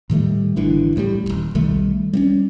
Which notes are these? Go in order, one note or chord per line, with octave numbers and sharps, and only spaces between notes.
A2 D#3 G3 A3
G#1 D3 E3
A#1 A2 F#3 G3
D#1 G#1
B1 D#3 G3 A3
G3 A#3 C#4